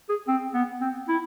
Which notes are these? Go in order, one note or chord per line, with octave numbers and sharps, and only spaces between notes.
G#4
C4
B3
C4
E4